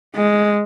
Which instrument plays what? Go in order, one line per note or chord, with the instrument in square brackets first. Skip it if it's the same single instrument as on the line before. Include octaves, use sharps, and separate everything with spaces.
[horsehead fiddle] G#3